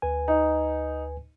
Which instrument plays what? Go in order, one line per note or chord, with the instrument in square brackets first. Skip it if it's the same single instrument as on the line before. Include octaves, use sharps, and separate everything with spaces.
[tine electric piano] D2 B4 G#5
[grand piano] D#4